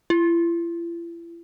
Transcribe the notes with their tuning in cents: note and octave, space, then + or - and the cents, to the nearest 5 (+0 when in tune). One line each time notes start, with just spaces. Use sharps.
E4 +45